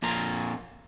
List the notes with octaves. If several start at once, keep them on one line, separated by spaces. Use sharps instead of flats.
F2 A#2 A#3 A#5